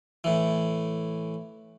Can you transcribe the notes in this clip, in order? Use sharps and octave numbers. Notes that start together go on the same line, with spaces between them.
A2 E3